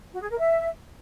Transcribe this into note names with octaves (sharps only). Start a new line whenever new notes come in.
F#4
G#4
A#4
E5